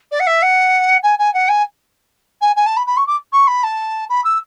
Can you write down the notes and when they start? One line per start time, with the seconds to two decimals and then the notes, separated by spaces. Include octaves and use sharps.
0.11 D5
0.19 F#5
0.27 E5
0.42 F#5
1.03 G#5
1.18 G#5
1.34 F#5
1.48 G#5
2.41 G#5
2.56 G#5
2.66 A5
2.76 B5
2.87 B5
2.97 C#6
3.07 D6
3.32 C#6
3.47 B5
3.63 A5
4.09 B5
4.24 E6